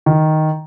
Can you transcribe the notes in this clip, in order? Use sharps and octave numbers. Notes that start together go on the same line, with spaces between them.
D#3